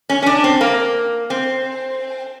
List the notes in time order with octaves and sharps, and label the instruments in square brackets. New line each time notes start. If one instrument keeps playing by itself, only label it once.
[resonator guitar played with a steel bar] C#4
C#4
D4
C4
A#3
C4